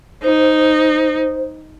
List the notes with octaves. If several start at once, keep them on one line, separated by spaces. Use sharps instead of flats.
D#4 C5